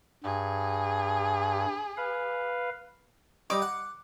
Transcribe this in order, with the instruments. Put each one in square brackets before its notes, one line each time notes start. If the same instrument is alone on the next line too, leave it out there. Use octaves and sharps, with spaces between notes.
[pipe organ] G2 [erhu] G#4
[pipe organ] B4 F5
[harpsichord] G3 D#4 [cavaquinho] D6
[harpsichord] F#5